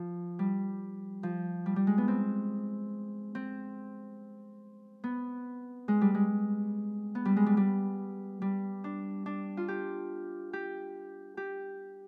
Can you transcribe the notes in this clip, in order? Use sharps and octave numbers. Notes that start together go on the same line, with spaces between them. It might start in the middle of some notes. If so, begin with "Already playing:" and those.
Already playing: F3
G3
F3
G3
G3
G#3
B3
C4
C4
B3
G#3
G3
G#3
B3
G3
G#3
G3
G3
G3
D4
D4
F4
G4
G4
G4